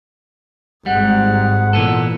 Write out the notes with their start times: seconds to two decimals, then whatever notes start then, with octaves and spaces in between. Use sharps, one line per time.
0.86 G#1 G#2 G3 F#5
1.73 A#2 E3 B3 A4